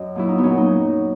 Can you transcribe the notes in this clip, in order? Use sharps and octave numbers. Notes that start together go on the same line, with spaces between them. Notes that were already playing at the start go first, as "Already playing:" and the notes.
Already playing: F#2 C#5 D#5
A#2 F#3 E4
D#4
B3
A#2 F#3 C#4
D#4